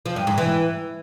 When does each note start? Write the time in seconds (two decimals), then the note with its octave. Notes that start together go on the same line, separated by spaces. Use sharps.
0.06 F3
0.16 G2
0.27 G#2
0.38 E3